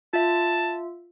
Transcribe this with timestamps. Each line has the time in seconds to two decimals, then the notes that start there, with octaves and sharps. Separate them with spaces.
0.13 F4 E5 A5